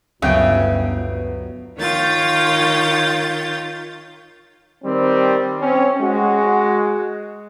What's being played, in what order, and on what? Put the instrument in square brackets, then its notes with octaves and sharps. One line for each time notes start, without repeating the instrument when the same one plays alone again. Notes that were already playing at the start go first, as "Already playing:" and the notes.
[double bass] G1 [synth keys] D2 F#3 B3 [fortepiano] C#3 G5 [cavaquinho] E5
[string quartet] D#3 F4 C#5 G6 A6
[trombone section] D#3 G3 C4
C4 C#4
G#3 F#4